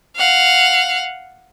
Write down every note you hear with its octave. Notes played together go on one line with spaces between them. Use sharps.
F5 F#5